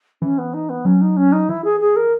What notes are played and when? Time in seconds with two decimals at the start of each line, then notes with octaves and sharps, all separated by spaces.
0.22 E3 C#4
0.38 B3
0.54 D#4
0.69 B3
0.85 F#3 C#4
1.01 D#4
1.17 C#4
1.32 D#4
1.49 E3 E4
1.64 G#4
1.80 G#4
1.96 A#4